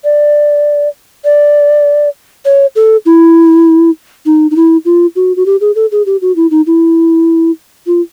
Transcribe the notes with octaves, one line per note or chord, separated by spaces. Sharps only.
D5
D5
C#5
A4
E4
D#4
D#4
E4
F4
F#4
F#4
G4
G#4
A4
G#4
G4
F#4
E4
D#4
E4
F4